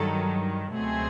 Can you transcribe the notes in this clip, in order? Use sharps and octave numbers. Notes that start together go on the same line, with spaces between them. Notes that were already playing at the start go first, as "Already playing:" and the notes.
Already playing: G2 D#3 F#3 A4
C#2 B2 F#3 A3 C4 G#4